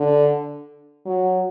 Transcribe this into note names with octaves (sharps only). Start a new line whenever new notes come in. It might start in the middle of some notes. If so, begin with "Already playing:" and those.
Already playing: D3
F#3